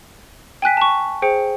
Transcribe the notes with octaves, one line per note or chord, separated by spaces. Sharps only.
G5 G#5 F#6 B6
A5 C#6
G#4 C5 G5 C#7